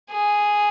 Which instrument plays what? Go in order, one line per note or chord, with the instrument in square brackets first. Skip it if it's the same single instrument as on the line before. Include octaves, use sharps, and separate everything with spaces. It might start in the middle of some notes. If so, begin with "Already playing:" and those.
[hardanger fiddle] G#4